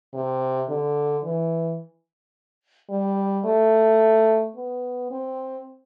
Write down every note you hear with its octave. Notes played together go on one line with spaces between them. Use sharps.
C3
D3
E3
G3
A3
B3
C4